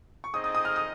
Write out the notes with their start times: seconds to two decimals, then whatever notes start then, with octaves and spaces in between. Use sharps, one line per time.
0.24 C#6
0.33 C4 D#4 G#4 D#5 D#6
0.44 D#6
0.55 D#6
0.65 F6
0.76 D#6